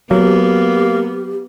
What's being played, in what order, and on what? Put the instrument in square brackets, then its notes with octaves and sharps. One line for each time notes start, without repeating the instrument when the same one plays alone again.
[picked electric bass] F#3 [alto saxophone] A#3 [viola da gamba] B3 [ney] G4